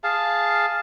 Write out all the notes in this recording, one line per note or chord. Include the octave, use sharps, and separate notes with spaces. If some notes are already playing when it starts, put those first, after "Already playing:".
G#4 F5 A5